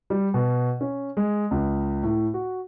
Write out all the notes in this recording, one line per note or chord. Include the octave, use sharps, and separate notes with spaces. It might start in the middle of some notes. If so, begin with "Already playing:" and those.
G3
B2
C#4
G#3
C#2
A2
F#4